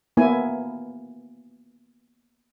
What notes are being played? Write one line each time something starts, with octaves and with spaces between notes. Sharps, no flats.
A#3 B3 E4 G#5